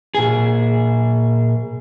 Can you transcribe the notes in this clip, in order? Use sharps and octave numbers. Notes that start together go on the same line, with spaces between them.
A#2 G#4